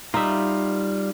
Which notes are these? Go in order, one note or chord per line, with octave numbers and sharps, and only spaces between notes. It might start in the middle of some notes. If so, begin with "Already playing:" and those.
G3 D#4 F4 E5